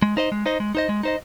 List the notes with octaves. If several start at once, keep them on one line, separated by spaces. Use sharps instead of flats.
G#3
D#4 C5 D#5
G#3
D#4 C5 D#5
G#3
D#4 C5 D#5
G#3
D#4 C5 D#5